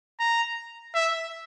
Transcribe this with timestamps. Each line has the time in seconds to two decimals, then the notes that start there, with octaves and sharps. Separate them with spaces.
0.20 A#5
0.95 E5